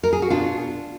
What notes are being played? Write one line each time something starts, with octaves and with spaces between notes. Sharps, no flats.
A#4
G#4
F#4
B2 D4 F4